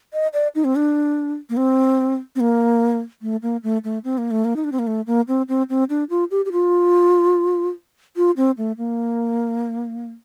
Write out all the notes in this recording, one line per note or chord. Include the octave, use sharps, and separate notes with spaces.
D#5
D5
D#4
C4
D4
A#3
C4
C4
A#3
A3
A#3
A3
A3
C4
A#3
A3
A#3
D#4
D4
C4
A#3
A3
A#3
C4
C4
C4
D4
F4
G4
G4
F4
F4
C4
A3
A#3